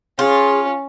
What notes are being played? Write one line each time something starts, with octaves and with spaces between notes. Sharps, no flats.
C#4 F4 G#4